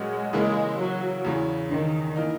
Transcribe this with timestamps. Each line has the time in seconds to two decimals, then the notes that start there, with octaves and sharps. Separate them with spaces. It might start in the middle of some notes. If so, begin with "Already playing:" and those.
Already playing: A#2 F#3 G#3 C#4 F#4
0.33 C#3 E3 G#3 A#3 E4
0.79 F#3
1.25 E2 C#3 E3
1.70 D#3
2.16 E3 A#3 D#4